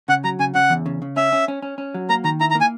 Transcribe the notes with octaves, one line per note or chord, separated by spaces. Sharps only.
C#3 F#5
F#3 A#5
C#3 G#5
C#3 F#5
E2
C#3
C#3
C#4 E5
C#4
C#4
C#4
C#4
F#3
A#3 A#5
D#3 A#5
E4 A#5
A#5
A#3
G#5